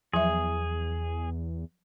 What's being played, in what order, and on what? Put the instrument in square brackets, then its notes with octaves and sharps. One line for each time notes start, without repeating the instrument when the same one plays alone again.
[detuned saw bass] E2 [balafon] F3 F#3 E5 [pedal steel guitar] G#4